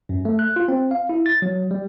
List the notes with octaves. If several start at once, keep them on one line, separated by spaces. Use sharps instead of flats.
F#2
A3
F#6
F4
C4
F5
E4
A6
F#3
G3